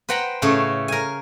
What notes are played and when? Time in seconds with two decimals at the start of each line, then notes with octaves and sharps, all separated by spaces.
0.09 B4 C5 F#5 G5 A#5 B5
0.42 A2 C#3 A3 C#5
0.88 A#4 G#5